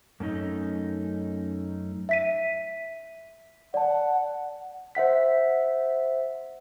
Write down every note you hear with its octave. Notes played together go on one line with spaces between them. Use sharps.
F#2 A3 C#4 D#4
E5 B6 D#7
D5 F#5 A5
C5 E5 F#5 B6